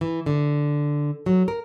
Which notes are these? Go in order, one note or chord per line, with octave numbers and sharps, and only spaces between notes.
E3
D3
F#3
A#4